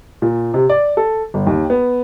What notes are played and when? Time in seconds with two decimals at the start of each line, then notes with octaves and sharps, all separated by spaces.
0.22 A#2
0.54 C3
0.70 D5
0.97 A4
1.34 G1
1.47 D#2
1.70 B3